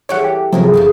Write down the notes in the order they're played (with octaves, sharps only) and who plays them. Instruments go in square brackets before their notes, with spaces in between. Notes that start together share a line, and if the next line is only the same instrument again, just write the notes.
[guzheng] E3 G3 A3 [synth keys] C#5 F#5
[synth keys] G4
[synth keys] C3 F3 F#3 [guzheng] A3 G#4 A#4
[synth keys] G1 [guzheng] E2 C#3 F3